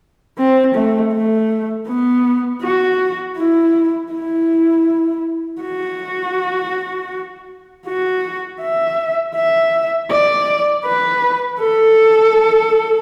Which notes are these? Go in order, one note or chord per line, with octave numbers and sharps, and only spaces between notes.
C4
A3
A3
B3
F#4
E4
E4
F#4
F#4
E5
E5
D5
B4
A4